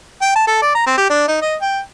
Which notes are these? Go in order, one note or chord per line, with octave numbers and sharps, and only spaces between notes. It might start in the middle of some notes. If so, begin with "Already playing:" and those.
G5
A5
A4
D5
A#5
C4
G4
D4
D#4
D#5
G5